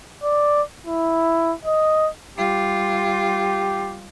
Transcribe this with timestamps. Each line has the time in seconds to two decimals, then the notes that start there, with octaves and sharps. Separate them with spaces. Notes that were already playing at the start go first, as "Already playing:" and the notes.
0.23 D5
0.86 E4
1.65 D#5
2.38 G3 F4 G4